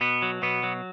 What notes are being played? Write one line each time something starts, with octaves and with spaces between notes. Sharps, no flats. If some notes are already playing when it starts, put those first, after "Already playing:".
B2 B3
F#3
B2 B3
F#3